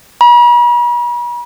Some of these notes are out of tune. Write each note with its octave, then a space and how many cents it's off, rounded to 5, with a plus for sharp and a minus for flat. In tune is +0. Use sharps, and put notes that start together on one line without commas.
B5 -45